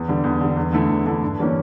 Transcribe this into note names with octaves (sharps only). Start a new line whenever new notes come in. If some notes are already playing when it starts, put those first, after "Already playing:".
Already playing: E2
D3 G3
E2
D3 G3
E2
D3 A3 E4
E2
D3 A3 E4
G2
E3 G3 A#3 C#4